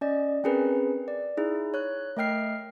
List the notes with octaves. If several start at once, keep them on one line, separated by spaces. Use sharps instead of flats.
C#4 D5 D#5
C4 C#4 G#4 A#4 B4
D5
D#4 E4 G#4
C#5 F#6
A3 A#4 D#5 G5 F6 C7